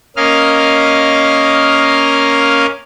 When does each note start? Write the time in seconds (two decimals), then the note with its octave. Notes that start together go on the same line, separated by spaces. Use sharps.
0.16 A#3 C#4 D#5 F5 F6